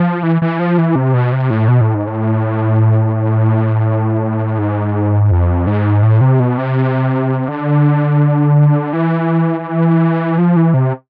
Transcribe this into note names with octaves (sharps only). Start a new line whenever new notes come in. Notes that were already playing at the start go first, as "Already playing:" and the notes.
Already playing: F3
E3
E3
F3
E3
C3
B2
C3
A2
B2
A2
G#2
A2
G#2
F2
G#2
A2
C3
B2
C3
D3
E3
F3
E3
C3